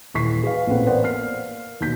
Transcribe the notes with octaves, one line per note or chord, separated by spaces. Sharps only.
D#1 E3 C#6 B6 C7
G#4 B4 F5
A1 A#2 A3 C4 B4 F#5
B3 A#4 C5 D5 F#5
A#3 F6 C7
D#2 B2 G6 B6